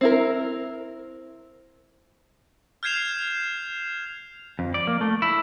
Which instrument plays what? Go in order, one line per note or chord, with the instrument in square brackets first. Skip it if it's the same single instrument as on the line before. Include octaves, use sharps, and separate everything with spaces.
[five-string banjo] C4 E4 A#4
[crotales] F6 G6 G#6 C7 E7 F7
[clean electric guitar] F2
D5
A#3
A3
E4